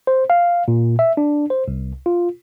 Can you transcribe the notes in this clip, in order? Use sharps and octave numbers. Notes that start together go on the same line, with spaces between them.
C5
F5
A#2
E5
D4
C5
C2
F4